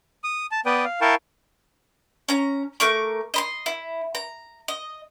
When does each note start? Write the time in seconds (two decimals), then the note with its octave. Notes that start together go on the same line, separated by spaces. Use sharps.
0.24 D#6
0.51 A5
0.66 B3 B4 D5 G5 D#6
0.85 F5
1.01 E4 A#4 F5 G5 A5 C#6
2.29 C#4 A#5
2.80 A3 A#4 C#6 D6
3.34 D#5 B5 C6
3.66 E4
4.15 A#5
4.68 D#5